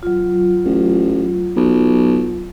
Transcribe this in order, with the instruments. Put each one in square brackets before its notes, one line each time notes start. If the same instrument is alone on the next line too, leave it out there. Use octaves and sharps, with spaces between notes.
[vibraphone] F#3 F4
[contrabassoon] A1
B1